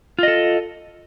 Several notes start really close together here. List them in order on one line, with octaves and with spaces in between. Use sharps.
F4 D#5 A4